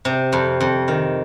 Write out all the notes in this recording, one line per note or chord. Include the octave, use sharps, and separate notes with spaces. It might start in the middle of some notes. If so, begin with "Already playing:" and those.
C3
F2
F2
D#3